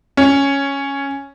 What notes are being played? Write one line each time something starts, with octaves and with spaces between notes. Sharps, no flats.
C#4